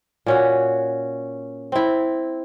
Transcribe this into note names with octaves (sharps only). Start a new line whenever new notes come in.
A#2 C#4 F#4
C4 E4